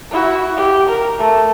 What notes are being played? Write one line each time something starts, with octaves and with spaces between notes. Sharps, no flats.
E4 F#4
G4
A#4
A3